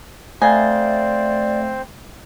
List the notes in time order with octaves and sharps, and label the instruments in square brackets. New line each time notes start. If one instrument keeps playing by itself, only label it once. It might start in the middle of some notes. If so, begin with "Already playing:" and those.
[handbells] A3 F5 A6 [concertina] C4 C5 [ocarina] D5 [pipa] G#5